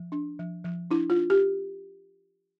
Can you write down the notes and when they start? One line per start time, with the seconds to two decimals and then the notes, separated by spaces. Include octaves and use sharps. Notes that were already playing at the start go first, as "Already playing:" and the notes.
Already playing: F3
0.12 D4
0.39 F3
0.64 F3
0.91 D4 E4
1.10 F4
1.16 D4
1.30 G4